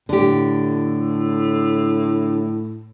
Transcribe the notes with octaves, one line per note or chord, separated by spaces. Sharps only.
A2 D3 G4